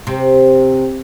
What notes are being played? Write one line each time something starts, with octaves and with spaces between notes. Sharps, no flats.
C3